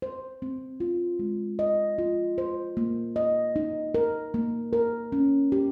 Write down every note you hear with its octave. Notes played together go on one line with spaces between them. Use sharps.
C5
C4
F4
G#3
D#5
F4
C5
A#3
D#5
D#4
A#4
A#3
A#4
C#4
G4